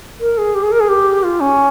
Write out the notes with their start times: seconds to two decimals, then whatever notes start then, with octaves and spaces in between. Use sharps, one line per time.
0.20 A#4
0.38 G#4
0.55 G4
0.63 G#4
0.72 A#4
0.80 G#4
0.89 G4
1.23 F4
1.40 C#4